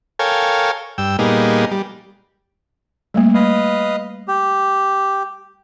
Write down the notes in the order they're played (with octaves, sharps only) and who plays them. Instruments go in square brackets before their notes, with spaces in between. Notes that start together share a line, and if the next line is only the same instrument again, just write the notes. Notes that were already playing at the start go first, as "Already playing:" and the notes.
[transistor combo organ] A4 A#4 C#5 F5 G5 G#5
G2 G5 E6
A#2 G3 A#3 B3 D#4 G#4
G3
[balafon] G3 A3 A#3
[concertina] B4 D#5 F5
G4